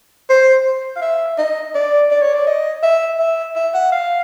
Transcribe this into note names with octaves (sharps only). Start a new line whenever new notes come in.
C5
F5
E5
D#5
D5
D5
C#5
D5
D#5
E5
E5
E5
F#5
F5